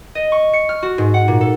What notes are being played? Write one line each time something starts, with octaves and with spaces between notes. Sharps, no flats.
D#5
C#6
C#7
F6
F#4
G#2
F#5
A#2
A4